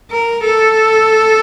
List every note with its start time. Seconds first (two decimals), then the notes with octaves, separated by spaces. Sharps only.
0.11 A#4
0.45 A4